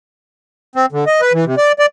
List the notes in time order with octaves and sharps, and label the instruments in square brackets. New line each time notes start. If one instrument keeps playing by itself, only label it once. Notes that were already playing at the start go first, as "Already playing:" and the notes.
[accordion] C4
D3
D#5
B4
E3
C3
D5
D5